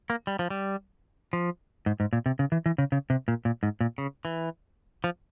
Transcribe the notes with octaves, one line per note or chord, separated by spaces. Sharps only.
A#3
G3
F3
G3
F3
G#2
G#2
A#2
C3
C#3
E3
E3
C#3
C#3
C3
A#2
A#2
G#2
A#2
C#3
E3
F3